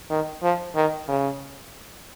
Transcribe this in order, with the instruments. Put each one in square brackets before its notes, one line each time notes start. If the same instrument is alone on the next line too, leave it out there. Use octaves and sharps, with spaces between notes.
[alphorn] D#3
F3
D#3
C#3